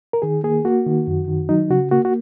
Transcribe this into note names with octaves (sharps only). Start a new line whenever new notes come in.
A#4
D#3 G#4
A#3 G#4
A#3 F#4
D#3
F#2
D#3
F#3 D#4
C#3 F#4
A#3 F#4
F#4